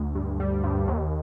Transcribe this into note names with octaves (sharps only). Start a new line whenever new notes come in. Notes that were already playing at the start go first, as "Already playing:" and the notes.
Already playing: D2
G2
G3
G2
D#2